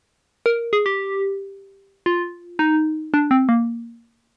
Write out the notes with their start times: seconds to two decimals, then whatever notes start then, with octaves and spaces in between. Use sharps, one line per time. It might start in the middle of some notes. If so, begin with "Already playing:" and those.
0.46 A#4
0.73 G#4
0.86 G4
2.06 F4
2.59 D#4
3.14 D4
3.31 C4
3.49 A#3